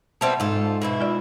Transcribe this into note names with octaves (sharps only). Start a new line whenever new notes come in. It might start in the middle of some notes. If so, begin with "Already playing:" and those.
E3 G3 B3 C4 E5 A5
G#2 F4 A4
B2 E3 E4
G#3 F4 D5